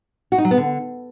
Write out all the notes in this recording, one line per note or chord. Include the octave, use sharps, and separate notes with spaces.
F#4
D#4
F#3
B3
D3